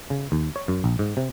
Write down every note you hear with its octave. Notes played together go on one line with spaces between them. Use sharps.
C#3
D#2
C#5
F#2
A#1
G#2
C3